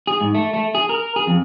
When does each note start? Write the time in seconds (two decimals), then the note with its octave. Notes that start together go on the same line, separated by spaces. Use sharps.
0.07 G#4
0.21 G#2
0.35 A3
0.54 A3
0.75 G#4
0.89 A#4
1.16 G#4
1.27 F2